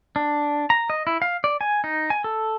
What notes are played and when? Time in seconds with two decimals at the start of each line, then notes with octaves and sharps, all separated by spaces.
0.16 D4
0.70 A#5
0.90 D#5
1.07 E4
1.22 F5
1.44 D5
1.61 G#5
1.84 D#4
2.10 G#5
2.24 A4